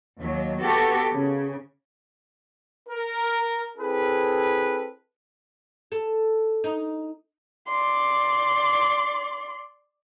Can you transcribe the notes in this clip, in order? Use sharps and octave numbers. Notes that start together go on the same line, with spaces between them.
D#2 F#3
B3 F#4 G4 A4
C#3
A#4
C4 E4 G#4 A4 B4
A4
D#4
D5 C6